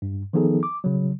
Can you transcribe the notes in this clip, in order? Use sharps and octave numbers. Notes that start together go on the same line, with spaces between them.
G2
D#3 F3 B3 D#4 G#4 A4
D6
C#3 F#3